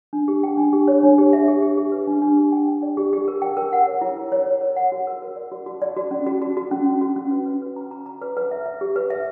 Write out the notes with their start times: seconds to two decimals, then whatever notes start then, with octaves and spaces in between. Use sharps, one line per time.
0.13 D4
0.28 G4
0.43 G5
0.57 D4
0.73 G4
0.88 C#5
1.03 D4
1.18 G4
1.33 E5
1.48 G4
1.62 G4
1.78 G4
1.92 B4
2.07 D4
2.22 D4
2.37 G4
2.52 G5
2.67 G5
2.82 D5
2.97 G4
3.13 G4
3.28 A#4
3.42 G5
3.57 A#4
3.73 F#5
3.87 C#5
4.01 E4
4.16 A#4
4.32 C#5
4.46 C#5
4.61 A#4
4.76 F#5
4.92 F#4
5.07 A#4
5.22 A#4
5.36 D5
5.52 F#4
5.66 F#4
5.82 D5
5.97 F#4
6.11 C#4
6.27 F#4
6.42 F#4
6.57 F#4
6.71 C#4
6.86 C#4
7.01 F#4
7.16 C#4
7.31 B4
7.46 B4
7.62 B4
7.76 A#5
7.91 A#5
8.06 A#5
8.22 B4
8.37 B4
8.51 E5
8.66 E5
8.81 G4
8.96 B4
9.10 E5